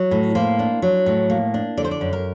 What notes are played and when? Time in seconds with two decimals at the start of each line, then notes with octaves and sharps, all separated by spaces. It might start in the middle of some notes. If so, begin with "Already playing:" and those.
Already playing: F#3
0.11 A2
0.35 A#3 C5
0.59 D4
0.82 F#3
1.06 A2
1.30 A#3
1.54 D4
1.77 D3 D5
1.84 C5
1.91 D5
2.01 F#2
2.13 A#4